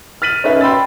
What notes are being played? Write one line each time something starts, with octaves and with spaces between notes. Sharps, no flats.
F6 A6 B6 D#7 F#7
C#4 D#4 B4 E5
G5 B5 C6 E6 A6